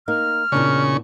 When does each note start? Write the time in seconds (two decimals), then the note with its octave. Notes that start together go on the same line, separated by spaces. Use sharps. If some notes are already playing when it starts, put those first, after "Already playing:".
0.08 A#3 D#4 F6
0.52 E2 A#2 C#3 D4 C#6